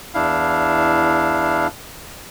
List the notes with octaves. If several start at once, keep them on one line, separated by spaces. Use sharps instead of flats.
E2 D4 E4 F5